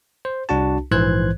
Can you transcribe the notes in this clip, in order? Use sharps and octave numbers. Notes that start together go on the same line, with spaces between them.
C5
C2 D4 F#4 A5
A#1 G#2 E3 C5 F#6 G#6